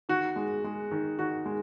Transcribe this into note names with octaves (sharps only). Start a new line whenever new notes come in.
D#3 F#4
G#3
G#3
D#3
D#3 F#4
G#3